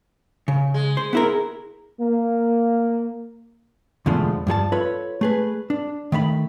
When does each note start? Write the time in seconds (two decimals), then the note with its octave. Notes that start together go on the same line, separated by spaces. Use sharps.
0.48 C#3
0.74 G#3
0.97 C5
1.13 B3 E4 A#4
2.01 A#3
4.06 E2 B2 D3 F3 G#3 A3
4.47 G2 F3 G#4 A5
4.72 F4 A4 B4 C#5
5.21 A3 G#4 B4
5.70 D4
6.12 D#3 A3 E5 B5